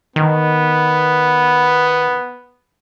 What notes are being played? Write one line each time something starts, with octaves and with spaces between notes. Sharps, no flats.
D#3 B3